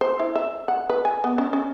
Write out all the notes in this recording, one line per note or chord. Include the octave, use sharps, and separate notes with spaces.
C5
E4
E5
F#5
B4
G#5
B3
C#4
C#4